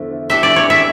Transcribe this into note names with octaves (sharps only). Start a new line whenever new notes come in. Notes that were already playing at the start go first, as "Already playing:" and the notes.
Already playing: E2 D3 F3 A3
E3 A3 D4 G4 E5
D5
C#5
E5